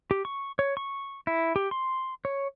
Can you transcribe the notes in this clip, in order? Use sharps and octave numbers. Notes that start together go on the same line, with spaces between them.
G4
C#6
C#5
C#6
E4
G4
C6
C#5